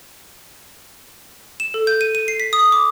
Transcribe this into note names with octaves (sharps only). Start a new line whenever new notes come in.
E7
A4
G6
D#7
D#7
C7
B6
D#6
D6